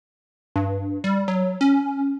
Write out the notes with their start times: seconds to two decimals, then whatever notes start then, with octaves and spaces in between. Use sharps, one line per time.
0.56 G2
1.04 G3
1.28 F#3
1.61 C#4